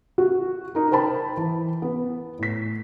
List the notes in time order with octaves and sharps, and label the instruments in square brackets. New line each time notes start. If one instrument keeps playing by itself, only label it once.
[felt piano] F#4
D#4 A#4
A#4 C5 G5 A5 B5
E3
B3
A2 B6